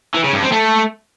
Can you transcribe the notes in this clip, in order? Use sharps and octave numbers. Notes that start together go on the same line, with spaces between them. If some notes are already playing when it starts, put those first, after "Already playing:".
E3
C#3
G2
C4
A3